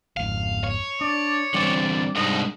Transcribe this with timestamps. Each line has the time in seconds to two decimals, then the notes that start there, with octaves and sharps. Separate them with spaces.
0.17 G#1 F2 F5
0.64 C#5
1.01 D4 D5
1.54 D3 E3 G3 C4 D5
2.16 C2 G#3 D4 D#4 D#5